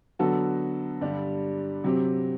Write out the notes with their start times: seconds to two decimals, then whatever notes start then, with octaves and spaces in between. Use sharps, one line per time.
0.19 D3 F#3 B3 F#4 A4
1.01 G2 D3 G3 D4 G4
1.84 C3 F#3 C4 G4